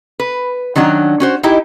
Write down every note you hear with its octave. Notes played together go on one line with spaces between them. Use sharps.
B4
D#3 F#3 C#4 D4 F#4
C#4 F#4 C5
D#4 E4 G4 G#4 D#5